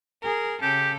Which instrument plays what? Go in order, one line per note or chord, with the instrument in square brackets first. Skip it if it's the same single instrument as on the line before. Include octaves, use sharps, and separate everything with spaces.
[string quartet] G#4 A#4
[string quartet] C#3 A4 [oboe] G4